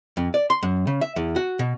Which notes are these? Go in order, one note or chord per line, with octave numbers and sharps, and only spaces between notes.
F2
D5
C6
F#2
C#3
E5
E2
F#4
B2